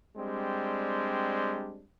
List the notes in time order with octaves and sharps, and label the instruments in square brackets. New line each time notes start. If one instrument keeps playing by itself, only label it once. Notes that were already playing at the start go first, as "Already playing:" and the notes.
[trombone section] G3 G#3 C4 D4